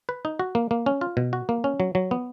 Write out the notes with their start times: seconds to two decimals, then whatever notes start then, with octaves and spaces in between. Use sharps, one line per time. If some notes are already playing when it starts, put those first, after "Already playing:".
0.09 B4
0.25 D#4
0.39 F#4
0.55 A#3
0.71 A#3
0.86 C#4
1.01 F4
1.17 B2
1.33 F#4
1.49 A#3
1.64 C#4
1.80 F#3
1.95 F#3
2.11 B3